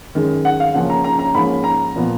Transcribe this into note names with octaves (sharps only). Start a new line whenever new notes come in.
F#2 D#3 G#3
F#5
F5
C#2 C#3 F3 A#3 C#4 F#5
A#5
A#5
A#5
G#2 F3 A#3 C#4 B5
A#5
A#2 F3 B3